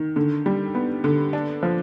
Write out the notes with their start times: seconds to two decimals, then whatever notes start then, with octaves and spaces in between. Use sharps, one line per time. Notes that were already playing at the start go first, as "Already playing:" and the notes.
Already playing: D#3
0.16 D3
0.46 G3
0.75 B3
1.04 D3
1.33 D4
1.63 F3